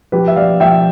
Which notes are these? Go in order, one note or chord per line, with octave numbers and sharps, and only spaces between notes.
F3 G4 B4
E5
F3 D5 F5
F3 E5 G5